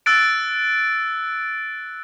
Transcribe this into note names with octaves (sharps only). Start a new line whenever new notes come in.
E6 F#6 A6 D7